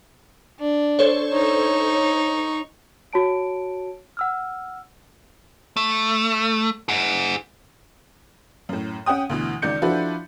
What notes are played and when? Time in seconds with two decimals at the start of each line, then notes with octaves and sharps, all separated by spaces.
0.59 D4
0.99 A4 C5 C#5
1.33 D#4 C#6
3.13 F#4 C#5 A5 D7
4.17 F#5 E6 F6
5.77 A3
6.89 G#4 F#5
8.69 F#2 A2
9.06 C#4 F#5 G5 D#6
9.29 D2 B2 E3
9.62 C#2 D#3 D5 G6 C#7
9.82 F3 D4 E4 F#4 A4 B4